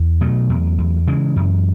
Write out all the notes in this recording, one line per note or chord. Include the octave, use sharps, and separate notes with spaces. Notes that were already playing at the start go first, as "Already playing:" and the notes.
Already playing: E2
B2 F#3 A3
E2
E2
C#3 E3 G#3
F#2